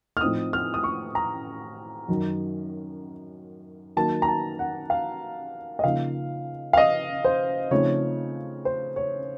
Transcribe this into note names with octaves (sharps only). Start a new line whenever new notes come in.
F6
A2 F3 C4 D#4 D#6
F6
D#6
C#6
A#5
F#2 D#3 F#3
D#3 F#3 A#3 A5
A#5
A5
F#5
F5
D#5
C#3 F3 A#3 D#4 F5
F5
D#5
C5
C#3 F3 A3 C4 D#4 C#5
C5
C#5